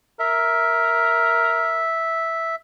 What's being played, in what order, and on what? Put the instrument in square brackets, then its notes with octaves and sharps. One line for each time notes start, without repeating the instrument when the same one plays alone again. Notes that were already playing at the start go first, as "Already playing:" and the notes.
[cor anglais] A#4 [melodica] E5